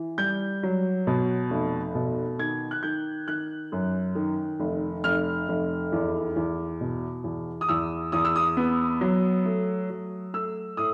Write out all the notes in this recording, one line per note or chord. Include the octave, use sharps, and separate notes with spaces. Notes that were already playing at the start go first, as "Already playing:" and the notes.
Already playing: E3
G3 G6
F#3
B2
F1
B2
D#3 G#6
F#6
D#3 G6
D#3 F#6
F#2
D#3
F1
F1 F6
F1
E2
E2
B2
E2
D#6
E2 E6
E2 D#6
E6
D#6
B3
F#3
A3
F#3
A3 E6
A2 D#6